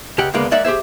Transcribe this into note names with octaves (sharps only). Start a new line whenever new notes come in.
C#2 C#3 G4 F#5 G5
D2 C#3 G#3 A#3 B3 D5
G#3 A#3 D5 E5 F#5
G4 G#4 C5 E5